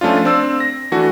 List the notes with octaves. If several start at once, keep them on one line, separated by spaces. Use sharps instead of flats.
F3 A3 C#4 D4 F4
C4 D4 E6
A#6
E3 A3 D4 F#4